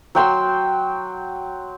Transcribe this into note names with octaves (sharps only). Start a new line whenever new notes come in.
F#3 G5 C6 E6